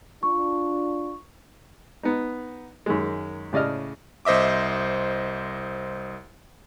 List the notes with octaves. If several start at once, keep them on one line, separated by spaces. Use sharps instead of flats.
D4 F4 C#6
B3 D#4
F#2 D#3 G#3
A2 C#3 D5 D#5 F6
C2 C5 D#5 E5 D6